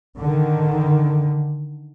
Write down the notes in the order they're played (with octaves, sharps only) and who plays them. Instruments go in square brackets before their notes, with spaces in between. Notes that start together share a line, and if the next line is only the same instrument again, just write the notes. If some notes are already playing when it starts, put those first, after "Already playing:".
[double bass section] D3 D#3